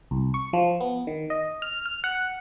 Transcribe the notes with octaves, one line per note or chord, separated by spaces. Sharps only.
C2
C#6
F3
B3
D#3
D#5
F6
F6
F#5